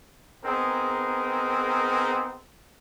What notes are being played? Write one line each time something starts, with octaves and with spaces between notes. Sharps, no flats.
B3 C4 D#4 G#4 A#4